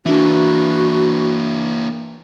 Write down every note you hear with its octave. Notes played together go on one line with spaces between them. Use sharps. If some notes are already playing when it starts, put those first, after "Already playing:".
E3 A#3 D4 E4 F#4